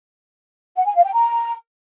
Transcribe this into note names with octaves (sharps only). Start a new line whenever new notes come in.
F#5
G#5
F5
G5
A#5